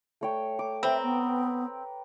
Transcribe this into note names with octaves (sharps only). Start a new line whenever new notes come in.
A3 C#5 G5
D6
C4 B4 E5 G5 A#5
B3